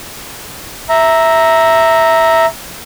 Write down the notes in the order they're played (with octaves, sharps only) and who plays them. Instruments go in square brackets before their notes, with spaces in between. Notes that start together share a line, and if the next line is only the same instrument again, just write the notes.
[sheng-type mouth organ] E5 A#5